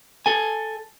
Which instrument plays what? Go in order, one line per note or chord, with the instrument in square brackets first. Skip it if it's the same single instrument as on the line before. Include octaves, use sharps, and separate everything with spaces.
[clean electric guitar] A4 G#5